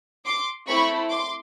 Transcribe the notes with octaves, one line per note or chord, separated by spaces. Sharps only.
C6 D6
A3 C4 E4 B5 C#6
C6 D6